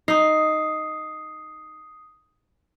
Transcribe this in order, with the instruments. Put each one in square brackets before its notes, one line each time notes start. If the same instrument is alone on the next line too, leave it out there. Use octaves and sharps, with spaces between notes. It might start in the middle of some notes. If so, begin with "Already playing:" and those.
[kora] D#4 [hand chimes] D#6 C7